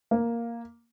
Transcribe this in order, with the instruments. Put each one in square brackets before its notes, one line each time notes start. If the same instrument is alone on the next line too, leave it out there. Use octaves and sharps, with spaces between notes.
[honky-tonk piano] A#3